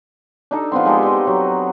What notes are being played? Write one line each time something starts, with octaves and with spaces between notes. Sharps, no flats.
D4 D#4 A4
F3 B3 C4 C6
G#3 D#4 G4 A4
A4 D#5
F#3